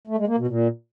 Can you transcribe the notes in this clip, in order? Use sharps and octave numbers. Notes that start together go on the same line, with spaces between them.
A3
G#3
A#3
B2
A#2